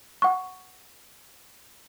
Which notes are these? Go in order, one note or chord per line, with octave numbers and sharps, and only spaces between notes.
F#5 C#6